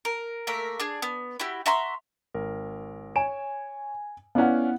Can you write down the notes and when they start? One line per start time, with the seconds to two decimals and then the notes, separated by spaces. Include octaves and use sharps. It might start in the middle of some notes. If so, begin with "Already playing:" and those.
0.05 A#4
0.47 A3 A#3 A#4 E5
0.80 D4 G#4
1.02 B3
1.40 E4 F#4 G4
1.66 F#4 E5 A#5 C6
2.34 G#1 A#4
3.16 C#5 G#5 D7 E7
4.35 B3 C#4 E4 D5 F5 F#5